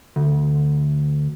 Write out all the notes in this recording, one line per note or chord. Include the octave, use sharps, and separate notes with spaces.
D2